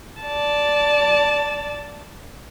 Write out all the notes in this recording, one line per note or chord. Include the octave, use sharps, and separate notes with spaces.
D5 A5